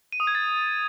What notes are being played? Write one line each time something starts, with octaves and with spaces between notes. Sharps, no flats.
D#7
D#6
G#6
A6